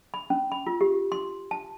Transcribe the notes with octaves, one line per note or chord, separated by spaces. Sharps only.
B5
C#4
B5
F4
G4
C6
A5